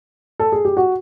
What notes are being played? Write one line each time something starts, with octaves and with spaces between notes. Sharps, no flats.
A4
G#4
G4
F#4